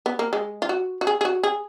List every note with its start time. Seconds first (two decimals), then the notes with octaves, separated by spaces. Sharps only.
0.06 B3
0.19 A#3
0.33 G#3
0.62 F4
0.69 F#4
1.01 F#4
1.07 G#4
1.21 G#4
1.25 F#4
1.43 G#4